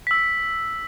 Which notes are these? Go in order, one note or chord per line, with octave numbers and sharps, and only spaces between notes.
E6 B6